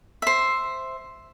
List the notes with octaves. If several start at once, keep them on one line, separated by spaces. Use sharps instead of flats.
C5 E5